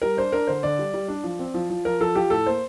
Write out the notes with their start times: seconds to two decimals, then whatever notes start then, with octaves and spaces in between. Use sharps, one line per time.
0.02 G3 A#4
0.17 D4 C5
0.32 D4 A#4
0.47 D3 C5
0.63 D3 D5
0.79 G3
0.94 G3
1.08 D4
1.24 F3
1.39 C4
1.54 F3
1.70 F3
1.85 F3 A#4
2.00 F3 A4
2.15 F3 G4
2.30 A2 A4
2.46 A#3 C5